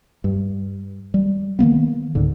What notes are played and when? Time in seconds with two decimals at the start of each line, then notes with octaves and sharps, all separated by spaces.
0.24 G2
1.14 G3
1.59 D#3 E3 A#3 B3
2.15 C#2 G#2 D3